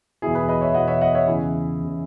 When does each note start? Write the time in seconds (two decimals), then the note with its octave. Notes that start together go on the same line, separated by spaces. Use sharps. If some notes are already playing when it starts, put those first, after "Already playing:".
0.22 E2 B2 E4 G#4
0.35 G#4 B4
0.48 B4 D#5
0.61 C#5 E5
0.74 E2 B2 D#5 F#5
0.88 C#5 E5
1.01 D#5 F#5
1.15 C#5 E5
1.27 E2 C#3 E3 E4 G#4
1.80 E2 C#3 E3